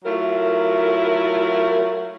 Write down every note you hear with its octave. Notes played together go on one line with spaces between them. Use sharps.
F#3 A3 E4 F4 A#4